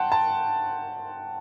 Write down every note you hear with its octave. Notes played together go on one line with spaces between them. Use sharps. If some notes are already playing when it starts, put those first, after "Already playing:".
Already playing: F#5 G5 A5 C6
A5